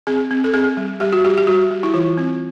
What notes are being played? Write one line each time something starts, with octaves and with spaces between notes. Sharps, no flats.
C4 G#4
C4
A4
C4 G#4
G3
G3 G4
F#4
G3 G4
G4
G3 F#4
G3
E4
E3 F4
C4